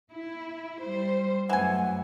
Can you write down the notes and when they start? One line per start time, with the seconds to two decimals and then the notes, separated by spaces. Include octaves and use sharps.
0.12 E4
0.83 G3 C5
1.50 F#2 E3 A3 F#5 G#5